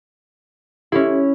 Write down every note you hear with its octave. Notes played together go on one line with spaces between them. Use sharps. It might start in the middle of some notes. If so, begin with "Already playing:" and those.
C#4 E4 G4 A4 E5